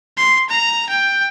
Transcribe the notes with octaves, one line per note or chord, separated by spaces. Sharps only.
C6
A#5
G5